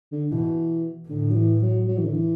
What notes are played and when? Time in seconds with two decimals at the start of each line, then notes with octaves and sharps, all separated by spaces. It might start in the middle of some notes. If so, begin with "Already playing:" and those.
0.12 D3
0.31 B2 E3
1.09 A2 D3
1.31 F#3
1.35 E3
1.62 F#3
1.88 F#3
1.97 E3
2.05 D3
2.14 E3